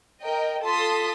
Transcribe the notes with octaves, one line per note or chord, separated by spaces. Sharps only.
A#4 D#5 G5
F4 A4 A5 C6 D#6 B6